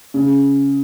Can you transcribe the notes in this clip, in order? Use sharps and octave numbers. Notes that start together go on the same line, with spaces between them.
C#3